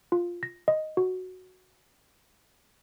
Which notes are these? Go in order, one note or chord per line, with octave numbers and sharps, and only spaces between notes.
F4
A#6
D#5
F#4